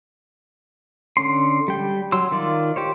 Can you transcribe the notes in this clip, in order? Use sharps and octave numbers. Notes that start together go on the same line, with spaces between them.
D3 C#4 C6
G3 G5
F#3 C6 E6
D#3 F4 D5
G4 C5 C#5